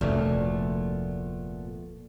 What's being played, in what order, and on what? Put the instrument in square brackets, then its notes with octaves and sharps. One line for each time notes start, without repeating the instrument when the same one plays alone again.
[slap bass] F1 D2 [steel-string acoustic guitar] A#2 A3 B3